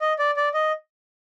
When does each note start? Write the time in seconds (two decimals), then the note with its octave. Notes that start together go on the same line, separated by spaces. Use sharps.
0.01 D#5
0.19 D5
0.37 D5
0.54 D#5